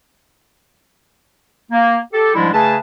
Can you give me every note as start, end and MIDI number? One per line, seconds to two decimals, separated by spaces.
1.71 1.97 58
2.13 2.35 67
2.13 2.35 69
2.35 2.49 44
2.35 2.49 53
2.35 2.49 55
2.35 2.49 56
2.35 2.49 62
2.35 2.49 64
2.53 2.76 49
2.53 2.76 57
2.53 2.76 68
2.53 2.76 71
2.53 2.76 81